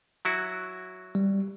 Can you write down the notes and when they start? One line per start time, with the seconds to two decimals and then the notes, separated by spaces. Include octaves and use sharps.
0.25 F#3 E4 F#4
1.15 G3